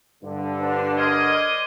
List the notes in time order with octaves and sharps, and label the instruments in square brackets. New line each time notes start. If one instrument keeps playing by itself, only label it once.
[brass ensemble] G2 D3
[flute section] D4 C5
[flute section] A#4 F6 G#6 [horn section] C5 D5 D#5